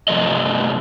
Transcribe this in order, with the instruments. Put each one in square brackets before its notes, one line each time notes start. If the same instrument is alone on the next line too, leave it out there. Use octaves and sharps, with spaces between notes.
[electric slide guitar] G2 C3 F3 A3 D#5